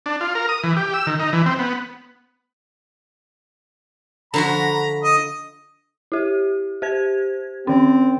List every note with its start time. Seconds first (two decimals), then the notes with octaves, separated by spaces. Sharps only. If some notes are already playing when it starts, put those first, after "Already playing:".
0.06 D4
0.21 F4
0.35 A#4
0.49 D#6
0.63 E3
0.77 G4
0.94 E6
1.07 D#3
1.20 D#4
1.33 E3
1.46 C4
1.59 B3
4.34 D3 F3 F#4 A#5 B5
5.03 D#5
6.12 E4 G4
6.82 G4 C5 G#6
7.67 D#3 C4 C#4